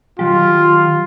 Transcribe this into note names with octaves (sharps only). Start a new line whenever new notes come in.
D#3 F#3 F4 G4